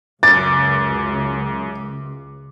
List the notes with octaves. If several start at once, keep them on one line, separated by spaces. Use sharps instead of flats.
C#2 F#2 D6 A6